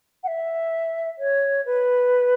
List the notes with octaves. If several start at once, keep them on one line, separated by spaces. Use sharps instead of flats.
F#5
E5
C#5
B4